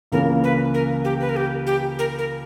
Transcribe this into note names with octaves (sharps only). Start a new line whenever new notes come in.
C#2 C#3 E3 A#3 C#4 A#4
B4
A#4
G4
B4
A#4
G4
G4
A#4
A#4